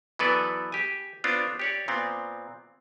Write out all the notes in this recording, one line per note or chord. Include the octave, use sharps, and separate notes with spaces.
E3 F#3 B3 A4 B4 D5
G4 G#5
B3 C4 D4 F4
G4 C#5 D5
A#2 B3 C4